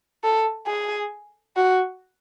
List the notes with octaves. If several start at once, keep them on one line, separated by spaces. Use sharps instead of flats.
A4
G#4
F#4